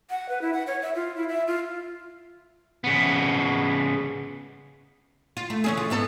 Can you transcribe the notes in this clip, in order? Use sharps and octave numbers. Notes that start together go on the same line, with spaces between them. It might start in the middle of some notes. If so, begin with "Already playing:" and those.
F#5
B4
E4
F#5
C#5
E5
F4
E4
E5
F4
C#3 B3
F4
A3
E3 C#4 G#4
F4
G#2 B3 A4